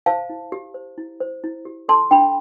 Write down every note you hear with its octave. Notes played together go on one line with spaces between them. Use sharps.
C5 F5 A5
E4
G4
C5
E4
C5
E4
G4
A4 A5 C6
D4 G5 B5